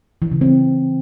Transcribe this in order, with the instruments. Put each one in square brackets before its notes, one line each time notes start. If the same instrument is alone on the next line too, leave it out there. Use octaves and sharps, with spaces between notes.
[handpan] E3
C#3
C4